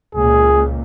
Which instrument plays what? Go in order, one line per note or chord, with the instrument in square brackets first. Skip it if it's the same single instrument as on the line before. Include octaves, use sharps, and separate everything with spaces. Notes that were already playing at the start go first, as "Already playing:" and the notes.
[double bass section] C#2 A#2 [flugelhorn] G#4